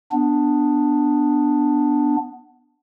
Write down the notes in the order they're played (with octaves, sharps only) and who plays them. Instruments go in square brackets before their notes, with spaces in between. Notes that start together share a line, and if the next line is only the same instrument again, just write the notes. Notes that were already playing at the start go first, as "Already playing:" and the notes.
[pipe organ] B3 D4